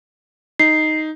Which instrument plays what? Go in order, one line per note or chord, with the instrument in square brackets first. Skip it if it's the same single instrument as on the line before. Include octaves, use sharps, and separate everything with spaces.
[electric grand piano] D#4 [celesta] C7